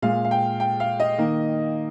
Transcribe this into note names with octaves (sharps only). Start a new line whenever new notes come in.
A#2 G#3 F5
F5
G5
G5
F5
D#5
D#3 A#3